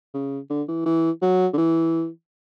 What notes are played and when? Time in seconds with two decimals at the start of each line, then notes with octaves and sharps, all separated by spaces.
0.14 C#3
0.50 D3
0.68 E3
0.86 E3
1.22 F#3
1.53 D3
1.58 E3